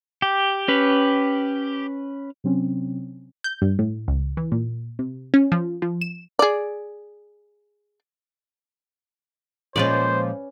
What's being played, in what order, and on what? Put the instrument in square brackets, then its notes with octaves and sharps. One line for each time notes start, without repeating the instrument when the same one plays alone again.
[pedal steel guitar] G4
[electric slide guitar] C#4 B4
[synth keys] C3 F#3 C4 C#4
[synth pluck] G6
G2
A2
C#2
E3
A#2
C3
C#4
F3
F3
E7
[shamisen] G#4 D5
[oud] A#2 F3 G#3 [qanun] C#4 B4 D5 [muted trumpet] C5